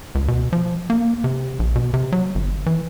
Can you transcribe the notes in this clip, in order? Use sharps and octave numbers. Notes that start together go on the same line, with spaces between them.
C#2
B2
F3
A#3
C3
A#1
B2
C3
F#3
G1
E3